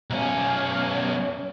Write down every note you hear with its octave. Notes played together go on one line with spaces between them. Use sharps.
B1 C#4